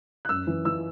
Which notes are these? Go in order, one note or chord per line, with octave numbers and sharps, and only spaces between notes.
F#6
F#2 E6
E3
E3 E6